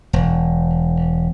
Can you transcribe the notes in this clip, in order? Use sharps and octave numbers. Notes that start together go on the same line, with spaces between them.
E1